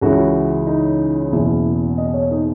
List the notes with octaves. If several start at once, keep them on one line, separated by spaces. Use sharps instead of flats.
C#2 C#3 E3 F#4
D#4
F#1 E2 B2 E4
D#5
C#5
D#4